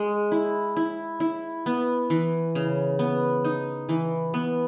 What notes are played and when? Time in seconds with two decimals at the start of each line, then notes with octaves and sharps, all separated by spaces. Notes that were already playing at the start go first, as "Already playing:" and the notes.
Already playing: G#3
0.32 E4
0.77 E4
1.20 E4
1.66 B3
2.10 E3
2.55 C#3
2.99 B3
3.45 D#4
3.89 E3
4.34 B3